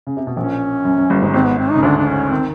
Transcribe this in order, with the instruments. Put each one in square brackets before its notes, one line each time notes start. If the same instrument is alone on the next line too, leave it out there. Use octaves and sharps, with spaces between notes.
[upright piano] C#3
C3
B2
[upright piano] A#1 A#2 [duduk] C#4
[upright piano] F#2
F#2
G1 G2
G#1 G#2
[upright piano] G#1 G#2 [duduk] C4
[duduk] B3
C4
[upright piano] C#3 [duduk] D#4
[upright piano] D2 D3 [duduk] D4
[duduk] D4
C#4
[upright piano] D#3 [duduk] C4